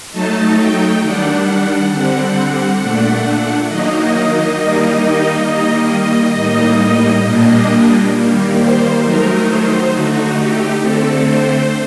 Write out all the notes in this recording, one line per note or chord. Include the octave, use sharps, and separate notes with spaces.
F#3 A3 D#4 A5
G5
D#3 G3 D4 F#5
F#5
D3 G3 C4
A#2 A3 D4
D#3 F#3 A#3 D#4 D#5
D#5
D#5
D#3 G3 A#3 D#4 D#5
D#3 G3 A#3
A2 G3 A#3 D#4
A#2 G3 A#3 D4
D#3 G3 A#3
C5
D#3 F#3 A3 D#4 A#4
C5
D3 A3 D#4 F#4
G4
D3 A3 C4 A4
C5